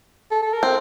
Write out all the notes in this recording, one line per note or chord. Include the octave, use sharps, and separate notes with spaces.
A4
A4
A#4
C4